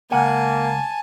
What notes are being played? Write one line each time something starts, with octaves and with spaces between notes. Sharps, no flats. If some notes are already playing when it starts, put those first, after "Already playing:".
C#2 A#3 F#5 G#5 A5